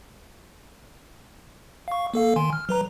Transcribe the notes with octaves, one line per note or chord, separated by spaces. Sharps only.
F5 C#6
A#3 A4 F5
D#3 G#5 C6
F6
F#3 B4 A#5